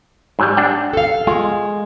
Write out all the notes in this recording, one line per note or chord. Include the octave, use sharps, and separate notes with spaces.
G#2 F#3 G3
D4 F#5 G5
A4 F5
G#3 F4